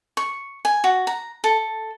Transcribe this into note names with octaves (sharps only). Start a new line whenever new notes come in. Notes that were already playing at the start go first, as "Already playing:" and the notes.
C#6
G#5
F#4
A#5
A4